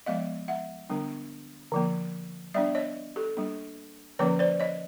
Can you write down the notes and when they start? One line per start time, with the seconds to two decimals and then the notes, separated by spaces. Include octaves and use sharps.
0.06 F3 G#3 B3 D#5 F5
0.48 E5 F#5
0.90 D3 G3 B3 D4
1.72 D3 F3 A#3
2.54 G3 B3 D4 D5 E5
2.75 C#5 D#5
3.16 G4 A4
3.37 G3 A#3 D4
4.19 D3 F3 A#3 C#4 B4 C#5
4.39 C5 D5
4.60 C#5 D#5